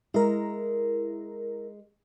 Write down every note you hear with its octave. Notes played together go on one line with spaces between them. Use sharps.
G#3 E4 A#4